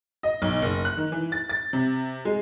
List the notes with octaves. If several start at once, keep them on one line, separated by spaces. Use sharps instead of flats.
D#5
B1
F#1
F#6
D#3
E3
A6
A6
C3
G#3